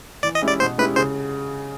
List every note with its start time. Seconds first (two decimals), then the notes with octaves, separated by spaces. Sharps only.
0.23 E3 D5
0.35 D#5
0.42 G#3 C#4 E4 G4
0.48 D5
0.60 B2 C5
0.78 G#3 C#4 E4 G4 B4
0.96 C#3 C5